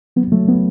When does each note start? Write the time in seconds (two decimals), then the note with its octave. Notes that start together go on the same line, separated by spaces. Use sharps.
0.16 F#3 B3
0.32 F#3 A3
0.47 F#3 B3